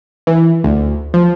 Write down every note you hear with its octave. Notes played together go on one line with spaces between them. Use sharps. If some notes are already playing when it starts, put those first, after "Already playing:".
E3
D2
F3